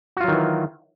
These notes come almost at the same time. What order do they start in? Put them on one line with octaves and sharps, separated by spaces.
F#4 F4 F#3 D#3 E3